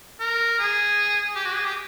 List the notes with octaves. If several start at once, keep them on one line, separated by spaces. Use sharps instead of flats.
A#4
G#4
G4
F#4
G#4
G4